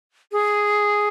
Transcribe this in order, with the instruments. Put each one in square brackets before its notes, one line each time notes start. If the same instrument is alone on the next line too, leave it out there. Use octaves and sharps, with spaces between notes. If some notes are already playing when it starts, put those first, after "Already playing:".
[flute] G#4